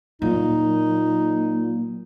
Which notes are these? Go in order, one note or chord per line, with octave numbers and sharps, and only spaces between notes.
A#2 F#3 D#4